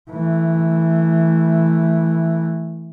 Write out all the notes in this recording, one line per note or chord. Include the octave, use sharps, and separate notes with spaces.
E3 A3